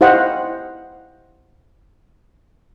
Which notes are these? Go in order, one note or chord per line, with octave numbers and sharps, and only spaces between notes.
E4 G4 C5 D#5 F5 F#5